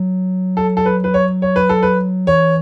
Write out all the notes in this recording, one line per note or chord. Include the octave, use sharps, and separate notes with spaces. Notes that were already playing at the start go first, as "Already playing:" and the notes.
Already playing: F#3
A4
A4
B4
B4
C#5
C#5
B4
A4
B4
E3 C#5